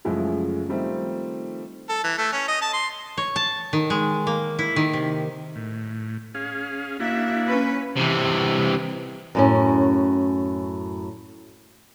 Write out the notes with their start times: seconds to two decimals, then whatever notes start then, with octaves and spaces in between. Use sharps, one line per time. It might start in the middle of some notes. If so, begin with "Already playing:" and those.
0.05 F#2 C#3 F3 G#3 A3 E4
0.69 D#3 F3 G3 A3 C4 D#4
1.89 A4
2.04 E3
2.18 A3
2.33 C#4
2.48 D#5
2.62 A5
2.74 C6
3.17 C#5
3.36 A5
3.73 D#3
3.90 G#3
4.27 A#3
4.59 E4
4.76 D#3
4.93 C3
5.56 A2
6.35 C#4 G#4 F5
7.00 A#3 D4 E4 F#4 E5
7.46 C#4 B4
7.96 C3 E3
9.35 F#2 A2 C#4